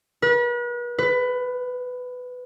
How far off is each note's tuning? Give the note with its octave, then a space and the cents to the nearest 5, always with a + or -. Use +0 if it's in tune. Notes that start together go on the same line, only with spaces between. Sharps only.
B4 -40
B4 +15